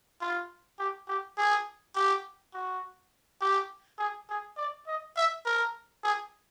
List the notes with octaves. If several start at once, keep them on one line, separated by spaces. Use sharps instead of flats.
F4
G4
G4
G#4
G4
F#4
G4
G#4
G#4
D5
D#5
E5
A#4
G#4